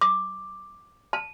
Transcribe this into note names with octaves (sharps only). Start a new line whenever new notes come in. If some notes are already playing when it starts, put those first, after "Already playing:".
D6
A5